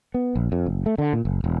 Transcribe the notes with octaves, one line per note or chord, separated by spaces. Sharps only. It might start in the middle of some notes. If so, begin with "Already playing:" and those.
B3
A#1
F2
F#1
A3
D3
A#2
F#1
E1